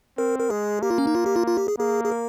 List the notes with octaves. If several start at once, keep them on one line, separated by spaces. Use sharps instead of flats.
C4 A#4
A#4
G#3 G#4
A#3 G4
F4
C#4
D#4
F4
G4
F4
F4
G4
G#4
A#3 G#4
G#4
A#4